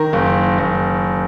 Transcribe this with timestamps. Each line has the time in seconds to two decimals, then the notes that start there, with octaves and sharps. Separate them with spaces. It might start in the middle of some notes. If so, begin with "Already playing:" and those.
Already playing: D#3 A#4
0.13 F#1
0.58 F#1